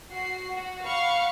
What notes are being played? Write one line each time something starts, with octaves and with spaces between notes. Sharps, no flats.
F#4 C7
F#4
F5 F#5 B5 C#6